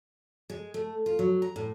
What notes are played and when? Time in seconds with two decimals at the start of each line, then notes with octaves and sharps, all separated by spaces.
0.50 G#3
0.74 A3
1.06 F4
1.19 F#3
1.42 A#5
1.56 A2